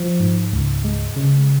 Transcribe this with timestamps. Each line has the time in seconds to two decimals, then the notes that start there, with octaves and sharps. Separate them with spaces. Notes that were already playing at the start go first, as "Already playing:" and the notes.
Already playing: F3
0.20 G#2
0.53 C#2
0.84 G#3
1.16 C#3